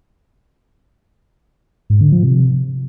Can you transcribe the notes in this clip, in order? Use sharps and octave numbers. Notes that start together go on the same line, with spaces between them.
G#2
D3
F3
C3